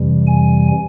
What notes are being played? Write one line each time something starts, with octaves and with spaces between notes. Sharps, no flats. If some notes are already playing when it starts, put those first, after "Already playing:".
Already playing: F2 C3 E3 G3
G#5